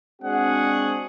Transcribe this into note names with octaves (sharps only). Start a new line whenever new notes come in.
G#3 C4 D4 F#4 G#4 F#5